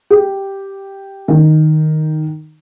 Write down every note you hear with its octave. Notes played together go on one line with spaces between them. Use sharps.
G4
D#3